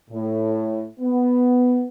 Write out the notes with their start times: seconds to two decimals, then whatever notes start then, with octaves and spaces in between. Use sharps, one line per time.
0.10 A2
1.00 B3